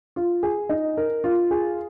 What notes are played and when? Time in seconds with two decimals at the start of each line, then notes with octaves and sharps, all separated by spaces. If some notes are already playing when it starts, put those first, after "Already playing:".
0.16 F4
0.43 G#4
0.69 D#4
0.97 A#4
1.24 F4
1.51 G#4